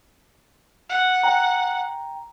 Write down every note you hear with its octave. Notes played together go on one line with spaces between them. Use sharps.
F#5
G5 A#5